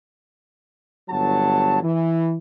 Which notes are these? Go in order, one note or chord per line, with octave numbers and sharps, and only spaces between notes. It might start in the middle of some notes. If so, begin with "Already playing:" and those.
G1 F#3 A5
E3